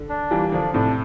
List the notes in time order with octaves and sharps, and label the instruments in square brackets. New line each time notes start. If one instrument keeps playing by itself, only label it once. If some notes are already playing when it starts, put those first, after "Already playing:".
Already playing: [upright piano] D3
[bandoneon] D4
[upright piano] E3 G3 [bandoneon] A#3
[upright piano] D3 F3 [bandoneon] D4
[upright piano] A2 C3 [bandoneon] D4